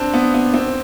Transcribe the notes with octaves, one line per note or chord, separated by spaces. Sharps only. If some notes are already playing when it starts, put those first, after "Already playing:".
Already playing: C4 D4
B3
B3
C4